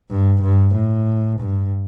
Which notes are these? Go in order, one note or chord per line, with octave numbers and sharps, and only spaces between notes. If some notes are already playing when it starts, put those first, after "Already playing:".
G2
G2
A2
G2